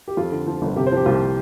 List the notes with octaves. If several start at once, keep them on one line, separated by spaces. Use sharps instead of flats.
G4
F2 F4
D3
F3
G1
C3 G4
C5
F3 G4
C2 F4